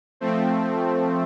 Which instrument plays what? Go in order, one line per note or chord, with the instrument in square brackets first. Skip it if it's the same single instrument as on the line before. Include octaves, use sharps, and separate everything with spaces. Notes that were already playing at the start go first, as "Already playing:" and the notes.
[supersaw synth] F3 A3 C4